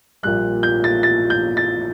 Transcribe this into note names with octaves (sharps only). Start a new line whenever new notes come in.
A#1 A#2 G3 F#6
G6
A6
A6
G6
A6